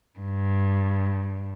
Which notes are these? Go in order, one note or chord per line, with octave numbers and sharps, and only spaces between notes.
G2